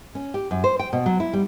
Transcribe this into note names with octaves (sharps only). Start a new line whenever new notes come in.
C#4
G4
F#2
C5
G5
B2
F#3
E4
G3